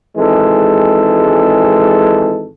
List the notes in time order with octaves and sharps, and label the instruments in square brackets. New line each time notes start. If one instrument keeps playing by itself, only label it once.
[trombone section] G#1 E3 G#3 A4